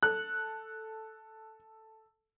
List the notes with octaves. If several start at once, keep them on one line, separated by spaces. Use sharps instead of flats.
A4 F#6